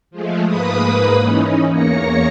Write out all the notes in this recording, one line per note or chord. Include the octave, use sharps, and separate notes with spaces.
F3 G#3 A3
G#2 A#3 B4 B5 D#6
E3 C#4 D#4
E2 A#3 C#5 A#6 C#7